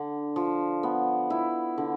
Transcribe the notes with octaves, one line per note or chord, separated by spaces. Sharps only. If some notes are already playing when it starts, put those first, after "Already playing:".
Already playing: D3
F3
B3
E4
D3